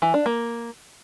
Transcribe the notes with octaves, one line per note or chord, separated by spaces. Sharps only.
E3
D4
A#3